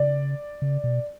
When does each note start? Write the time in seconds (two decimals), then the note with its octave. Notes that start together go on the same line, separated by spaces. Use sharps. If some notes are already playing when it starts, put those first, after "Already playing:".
Already playing: C#3 D5
0.62 C#3
0.84 B2